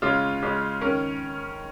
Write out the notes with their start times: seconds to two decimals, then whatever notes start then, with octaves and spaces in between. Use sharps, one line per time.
0.02 C#3 G#3 C#4 F4
0.43 C#3 G#3 C#4
0.81 D#3 C#4 A#4